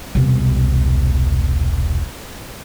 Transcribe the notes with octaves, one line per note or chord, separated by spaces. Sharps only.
E1 C2